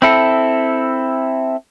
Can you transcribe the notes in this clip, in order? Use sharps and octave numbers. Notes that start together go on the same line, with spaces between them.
C4 E4 A4